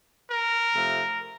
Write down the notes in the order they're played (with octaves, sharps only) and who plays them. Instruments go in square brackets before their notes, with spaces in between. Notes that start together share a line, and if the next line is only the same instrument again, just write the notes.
[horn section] A#4
C3 F3 A3